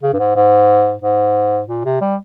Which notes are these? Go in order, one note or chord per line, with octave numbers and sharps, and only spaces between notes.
C#3
G2
G#2
G#2
G#2
A#2
C3
G3